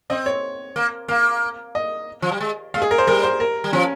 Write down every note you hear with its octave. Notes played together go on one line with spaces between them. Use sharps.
C4 D#5
C#5
A#3
A#3 F5
D#5
F3
G3
G#3
G#3 F5
G#4
A#4
C5
G3 A#4
C5
A#4
G3
F3 C#4